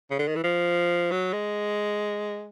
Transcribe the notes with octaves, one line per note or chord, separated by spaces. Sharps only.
C#3
D3
D#3
E3
F3
F#3
G#3